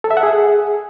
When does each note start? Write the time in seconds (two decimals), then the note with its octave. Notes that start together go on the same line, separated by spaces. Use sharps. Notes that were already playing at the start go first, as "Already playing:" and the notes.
0.04 A4
0.11 E5
0.17 F#5
0.23 G#4